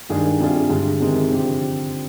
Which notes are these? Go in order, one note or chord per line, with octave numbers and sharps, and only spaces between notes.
G2 D#3 G#3 D4 G#4
C3 G3 D4 F4 G#4
G2 D3 G#3
C3 D#3 G#3
D3 F3 C4 G4